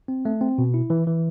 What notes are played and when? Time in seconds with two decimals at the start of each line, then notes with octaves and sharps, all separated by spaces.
0.08 C4
0.25 A3
0.41 C4
0.58 B2
0.74 E4
0.90 E3
1.07 E3